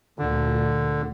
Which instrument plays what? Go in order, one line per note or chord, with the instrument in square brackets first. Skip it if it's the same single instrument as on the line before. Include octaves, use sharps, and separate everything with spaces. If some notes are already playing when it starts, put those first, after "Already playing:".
[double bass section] D2 A#2 [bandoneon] D3